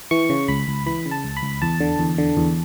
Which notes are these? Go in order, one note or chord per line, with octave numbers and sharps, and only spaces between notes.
E3 C#6
C#3
C#2 B5
C#2
E3 B5
C#3
A5
C#2
B5
C#2
E2 A5
D3
E2
D3
E2